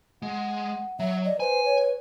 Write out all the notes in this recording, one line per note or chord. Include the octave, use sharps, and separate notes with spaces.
G#3 F#5
F#3 E5
D5 D#5
B4 C5 G#5
C#5